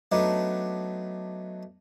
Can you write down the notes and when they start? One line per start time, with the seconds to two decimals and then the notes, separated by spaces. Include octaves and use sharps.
0.12 F#3 A3 B3 D4 D#4